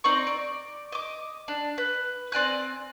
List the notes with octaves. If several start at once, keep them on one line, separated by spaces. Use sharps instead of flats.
C4 D#4 D5 C#6
D5
D#5 D6
D4
B4
C4 D5 G#5 F#6